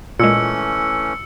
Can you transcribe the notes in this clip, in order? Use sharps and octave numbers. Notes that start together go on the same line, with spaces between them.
A#2 E3 G#3 A3 C#4 E6 C#7